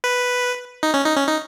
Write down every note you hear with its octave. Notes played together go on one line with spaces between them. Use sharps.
B4
D#4
C#4
D#4
C#4
D#4